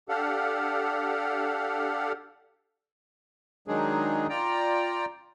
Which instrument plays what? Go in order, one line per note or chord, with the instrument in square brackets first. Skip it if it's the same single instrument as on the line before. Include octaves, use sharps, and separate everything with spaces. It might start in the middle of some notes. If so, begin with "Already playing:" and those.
[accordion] D4 G4 A4 F5 F#5
D#3 F#3 G#3 D4 D#4 G#4
F4 D5 G5 A#5